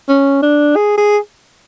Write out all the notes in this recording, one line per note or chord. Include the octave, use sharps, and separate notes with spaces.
C#4
D4
G#4
G#4